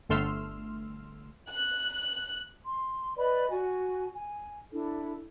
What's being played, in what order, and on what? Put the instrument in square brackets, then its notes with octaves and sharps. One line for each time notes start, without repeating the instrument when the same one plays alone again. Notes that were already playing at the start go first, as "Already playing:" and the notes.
[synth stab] G1 D3 A3 C6 E6 F6
[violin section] F#6
[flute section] C6
B4 D5 D#5 B5
F#4 G#5
G#5
D4 E4 A4